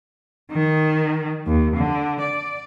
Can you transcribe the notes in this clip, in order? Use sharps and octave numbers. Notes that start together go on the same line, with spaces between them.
D#3
D#2
D3
D5